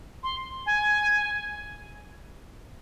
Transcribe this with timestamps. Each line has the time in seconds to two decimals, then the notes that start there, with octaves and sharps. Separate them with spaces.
0.23 C6
0.66 G#5